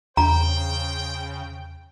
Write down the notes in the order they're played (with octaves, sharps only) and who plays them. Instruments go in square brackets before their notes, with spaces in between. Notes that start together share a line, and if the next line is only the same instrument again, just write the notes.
[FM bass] E2 [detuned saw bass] C#3 [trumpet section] C5 G5 [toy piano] A#5